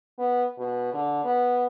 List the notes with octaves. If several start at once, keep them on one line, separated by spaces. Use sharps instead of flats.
B3
B2
D3
B3